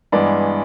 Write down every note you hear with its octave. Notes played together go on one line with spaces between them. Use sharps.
G2 E3 G#3 B3 D5